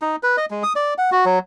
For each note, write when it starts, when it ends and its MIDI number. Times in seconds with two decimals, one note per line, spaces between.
0.02 0.16 63
0.23 0.36 71
0.37 0.45 75
0.50 0.63 56
0.63 0.73 87
0.76 0.94 74
0.98 1.10 78
1.12 1.25 66
1.25 1.39 54